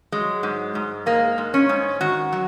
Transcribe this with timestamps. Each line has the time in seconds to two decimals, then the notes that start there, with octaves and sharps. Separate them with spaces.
0.12 F#3 G#3
0.43 G#2
0.75 G#2
1.06 G#3 A#3
1.38 G#2
1.54 C#4
1.69 G#2
2.01 D#3 F#4
2.33 F#3